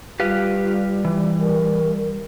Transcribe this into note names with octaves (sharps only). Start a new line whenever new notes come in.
G3 F4 G4 B4 F5
E3
A#4